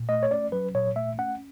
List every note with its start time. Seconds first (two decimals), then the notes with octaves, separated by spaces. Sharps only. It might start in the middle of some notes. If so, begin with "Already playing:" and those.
Already playing: A#2
0.09 A3 D#5
0.23 C#5
0.31 C#4 D5
0.52 F#3 B4
0.75 A#2 C#5
0.96 A3 E5
1.18 C#4 F#5